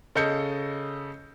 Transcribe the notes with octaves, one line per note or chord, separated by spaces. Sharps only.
C#3 A4 D#5 G6 C#7